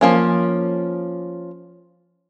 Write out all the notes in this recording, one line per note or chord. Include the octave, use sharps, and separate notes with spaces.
F3 A#3 C#4